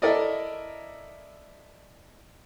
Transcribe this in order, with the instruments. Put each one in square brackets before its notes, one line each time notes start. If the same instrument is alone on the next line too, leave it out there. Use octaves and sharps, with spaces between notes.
[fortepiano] E4 A4 A#4 D5 D#5